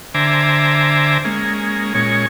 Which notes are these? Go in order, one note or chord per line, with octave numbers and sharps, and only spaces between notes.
D3 C5 E5 G#5 A#5 D6
G#3 A#3 C#4
A#2 G#3 C#4 C#5